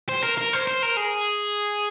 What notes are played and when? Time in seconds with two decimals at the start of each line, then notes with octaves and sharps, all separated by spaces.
0.09 C5
0.23 A#4
0.38 A#4
0.53 C5
0.67 C5
0.83 A#4
0.97 G#4